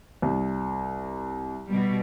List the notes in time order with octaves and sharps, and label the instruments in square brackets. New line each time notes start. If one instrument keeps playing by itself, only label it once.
[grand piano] C2
[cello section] B2 G3